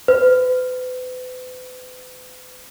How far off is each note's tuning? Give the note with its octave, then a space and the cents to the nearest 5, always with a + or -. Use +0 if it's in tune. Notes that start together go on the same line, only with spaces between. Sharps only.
B4 +40